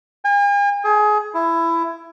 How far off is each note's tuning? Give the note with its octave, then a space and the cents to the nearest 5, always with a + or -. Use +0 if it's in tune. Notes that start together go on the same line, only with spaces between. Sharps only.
G#5 -45
G#4 +25
E4 +15